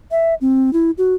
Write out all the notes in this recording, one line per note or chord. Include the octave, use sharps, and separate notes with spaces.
E5
C4
E4
F#4